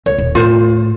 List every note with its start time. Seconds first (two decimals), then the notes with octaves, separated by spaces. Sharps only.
0.06 C#2 C#5
0.18 D#1
0.35 A2 F4 C5